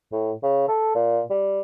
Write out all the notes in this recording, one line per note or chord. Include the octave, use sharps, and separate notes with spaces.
A2
C#3
A4
A#2
G3